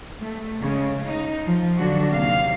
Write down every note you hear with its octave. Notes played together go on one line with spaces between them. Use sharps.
A3
C#3 G#3
D#4
F3
D3 F#3 D4 F#4
D#2 C3 F5